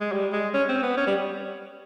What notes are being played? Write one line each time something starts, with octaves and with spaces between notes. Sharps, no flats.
G#3
G3
G#3
C#4
C4
B3
C#4
G3